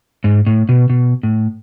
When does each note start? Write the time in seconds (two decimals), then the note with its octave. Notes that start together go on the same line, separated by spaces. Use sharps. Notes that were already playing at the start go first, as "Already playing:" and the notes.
0.24 G#2
0.46 A2
0.69 B2
0.90 B2
1.23 A2